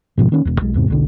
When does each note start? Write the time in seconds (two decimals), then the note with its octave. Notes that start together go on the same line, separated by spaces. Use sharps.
0.17 G#2 B2 F3
0.32 D#3 A#3 C#4
0.45 E1 E2
0.61 B1 G#3
0.74 E2 G#2 C3
0.88 E1 B1 D3